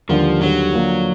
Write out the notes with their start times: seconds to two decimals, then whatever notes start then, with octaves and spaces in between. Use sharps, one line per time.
0.09 D#2 D3 F3 G3
0.41 D#2 D3 F#3 G3
0.72 D3 F3 A#3 D4